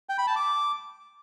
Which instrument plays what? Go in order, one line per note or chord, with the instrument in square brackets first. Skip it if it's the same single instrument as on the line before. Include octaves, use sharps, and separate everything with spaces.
[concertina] G5
B5
A5
D6